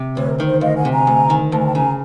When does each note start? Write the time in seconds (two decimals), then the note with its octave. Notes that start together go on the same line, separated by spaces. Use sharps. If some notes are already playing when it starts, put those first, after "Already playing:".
Already playing: C3
0.16 D2 B4 C#5
0.30 A#4
0.38 D#3 B4
0.47 C5
0.61 D2 D#5 F5
0.77 F#5 G#5
0.85 C3
0.92 G#5 A#5
1.07 D2
1.30 D#3
1.52 D2 A5
1.59 G#5
1.66 G5 A5
1.75 C#3 G#5 A#5